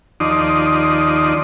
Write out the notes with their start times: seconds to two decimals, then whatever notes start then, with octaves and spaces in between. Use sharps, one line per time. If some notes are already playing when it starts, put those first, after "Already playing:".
0.20 D#2 F3 D#4 D5 C6 D#6